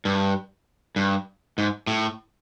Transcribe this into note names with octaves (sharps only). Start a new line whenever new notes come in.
G2
G2
G#2
A2